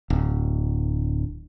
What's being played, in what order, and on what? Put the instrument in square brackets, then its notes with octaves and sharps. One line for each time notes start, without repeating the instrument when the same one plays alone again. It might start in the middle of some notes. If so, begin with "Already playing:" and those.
[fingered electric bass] D1